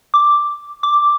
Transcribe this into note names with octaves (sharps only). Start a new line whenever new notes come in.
D6
D6